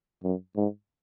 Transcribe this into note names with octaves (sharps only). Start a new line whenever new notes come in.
F#2
G#2